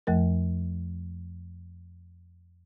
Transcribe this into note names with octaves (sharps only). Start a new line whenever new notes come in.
F2 F3 A3 A#4